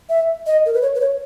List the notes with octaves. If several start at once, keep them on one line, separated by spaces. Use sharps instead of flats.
E5
D#5
A#4
B4
C#5
B4
C#5